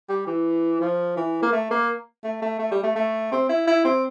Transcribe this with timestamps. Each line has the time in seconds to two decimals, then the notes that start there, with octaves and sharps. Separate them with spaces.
0.09 G3
0.27 E3
0.81 F3
1.17 E3
1.42 A#3
1.52 A3
1.71 A#3
2.24 A3
2.42 A3
2.59 A3
2.71 G3
2.83 A3
2.95 A3
3.32 C4
3.49 E4
3.67 E4
3.84 C4